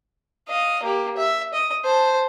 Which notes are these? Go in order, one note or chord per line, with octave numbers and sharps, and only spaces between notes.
D#5 F5
A#3 G4
E5
D#5
C5 A5